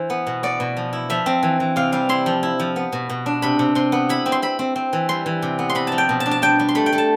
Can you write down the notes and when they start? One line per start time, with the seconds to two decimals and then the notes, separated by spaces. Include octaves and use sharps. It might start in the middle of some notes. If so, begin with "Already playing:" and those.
Already playing: E3 C5
0.10 B3
0.27 B2
0.43 B3 D5
0.60 B2
0.77 F3
0.93 E4
1.10 F3 E5
1.26 C4
1.43 E3
1.60 E3
1.76 C3 F5
1.92 G3 F5
2.09 E4 C6
2.26 F3
2.43 E4
2.60 F3
2.76 B3
2.93 B2
3.10 B2
3.26 D4
3.42 C3 B5
3.59 C3
3.75 C3 C6
3.92 B3
4.09 E4 B5
4.26 C4
4.32 C6
4.42 C4 B5
4.59 C4
4.76 C4
4.93 E3
5.09 G3 C6
5.26 E3
5.42 C3
5.59 B3
5.70 C6
5.75 C3 B5
5.87 F3 A5
5.98 G5
6.09 B2
6.20 A5
6.26 D4
6.31 A5
6.42 G3 G5
6.59 G3
6.68 C6
6.75 A3 B5
6.86 G5
6.93 A3
6.98 A5